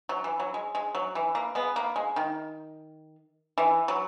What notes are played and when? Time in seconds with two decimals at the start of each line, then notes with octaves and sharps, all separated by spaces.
0.09 F#3
0.24 E3
0.40 F#3
0.54 G#3
0.75 G#3
0.95 F#3
1.15 E3
1.35 A#3
1.55 G#3 B3
1.76 A#3
1.96 G#3
2.16 D#3
3.58 E3
3.88 F#3